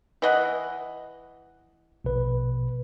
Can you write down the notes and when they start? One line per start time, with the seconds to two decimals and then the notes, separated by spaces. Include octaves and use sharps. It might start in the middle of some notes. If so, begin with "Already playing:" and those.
0.22 E3 D#5 F#5
2.04 A#1 B2 B4